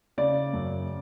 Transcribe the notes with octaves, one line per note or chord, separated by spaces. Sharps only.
C#3 D5
F#2